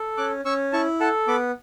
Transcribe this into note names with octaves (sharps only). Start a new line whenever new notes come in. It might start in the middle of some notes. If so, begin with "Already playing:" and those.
Already playing: A4
C#4 D6 F#6
C#4 C#6 E6
E4 A5 C#6
A4 F#5 A5
B3 B5 D6